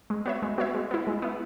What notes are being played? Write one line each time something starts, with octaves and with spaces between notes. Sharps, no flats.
G#3
B3 F#4 C#5 E5
G#3
B3 F#4 C#5 E5
G#3
B3 E4
G#3
B3 E4